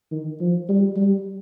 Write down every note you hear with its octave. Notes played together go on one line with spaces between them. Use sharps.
D#3
F3
G3
G3